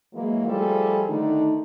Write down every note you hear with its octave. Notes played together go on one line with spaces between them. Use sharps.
E3 F#3 G#3 A#3
F3 G3 A3 G#4 A4
D3 D#3 A3 D#4